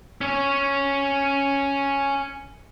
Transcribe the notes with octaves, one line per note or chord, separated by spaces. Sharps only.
C#4 C#5